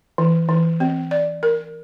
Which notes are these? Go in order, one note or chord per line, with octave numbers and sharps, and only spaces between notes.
E3
E3
C4
D5
A#4